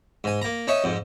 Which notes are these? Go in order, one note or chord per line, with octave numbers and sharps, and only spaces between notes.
G#2 G#5
A#3 A#5
C#4 D#4 C#5 E5 C#6
F2 G#2